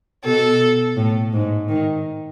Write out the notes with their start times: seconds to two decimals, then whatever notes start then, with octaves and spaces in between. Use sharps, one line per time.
0.24 B2 A4
0.97 A2
1.33 G#2
1.68 D#3